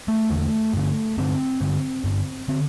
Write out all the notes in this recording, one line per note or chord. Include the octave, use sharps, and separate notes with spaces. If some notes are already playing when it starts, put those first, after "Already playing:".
A3
E2 D3
G2 D3
G2 D3 C4
G2 D3
G2 D3
D3 C4